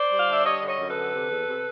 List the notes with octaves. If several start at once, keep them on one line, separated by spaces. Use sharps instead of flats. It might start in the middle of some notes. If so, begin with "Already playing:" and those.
Already playing: C5 D5
G3
F5
D3 E5
G3 C#5 D#5
D3
C#5 D#5
F#2
A4 B4
D3
C3
E2
C3